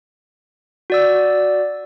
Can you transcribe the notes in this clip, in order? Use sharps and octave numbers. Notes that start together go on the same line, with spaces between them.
F#4 D5 E6